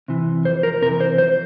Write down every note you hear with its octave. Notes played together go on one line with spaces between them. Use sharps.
C3 E3
F2 C5
A#4
C3 E3 A#4
C5
F2 C5